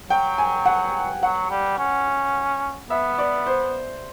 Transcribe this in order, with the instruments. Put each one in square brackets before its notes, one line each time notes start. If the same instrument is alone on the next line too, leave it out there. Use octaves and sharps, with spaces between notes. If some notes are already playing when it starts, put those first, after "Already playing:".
[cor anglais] F#3 [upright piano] G5
[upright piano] G#5
F#5
[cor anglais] F#3 [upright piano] F#5
[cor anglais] G3
C#4
[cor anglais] B3 [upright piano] E5
[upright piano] D5
C5